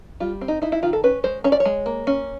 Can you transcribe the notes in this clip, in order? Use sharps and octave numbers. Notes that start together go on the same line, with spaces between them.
G3 F4
C4
D#4
D#4 E4
E4
D#3 F4
A4
C#4 B4
G#3 C5
C#4 C#5
D5
C#5
G#3
A#3
C#4